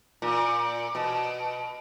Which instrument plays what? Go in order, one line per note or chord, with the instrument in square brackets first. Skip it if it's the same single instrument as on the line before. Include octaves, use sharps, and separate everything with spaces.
[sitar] A#2
B2